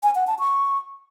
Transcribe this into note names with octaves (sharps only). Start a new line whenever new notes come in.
G#5
F#5
A5
C#6